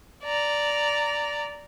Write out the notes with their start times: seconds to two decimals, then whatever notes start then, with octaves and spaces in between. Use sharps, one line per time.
0.24 D5 A#5